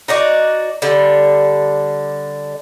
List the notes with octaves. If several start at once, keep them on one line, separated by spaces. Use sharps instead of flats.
D#4 F#4 D5
D3 G3